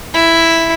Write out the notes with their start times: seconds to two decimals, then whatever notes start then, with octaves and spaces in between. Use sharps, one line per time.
0.14 E4